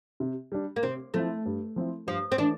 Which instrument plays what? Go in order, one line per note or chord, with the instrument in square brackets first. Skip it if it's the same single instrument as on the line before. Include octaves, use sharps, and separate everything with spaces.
[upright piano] C3
G3 D4
[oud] A#3
[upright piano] C3 [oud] C4
[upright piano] F3 C4 E4 [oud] A3
[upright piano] G2
F3 C4 E4
[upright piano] G2 [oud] F3
[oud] C4
[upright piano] E3 A3 [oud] D4